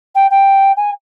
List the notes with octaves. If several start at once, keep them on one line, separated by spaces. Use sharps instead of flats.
G5
G5
G#5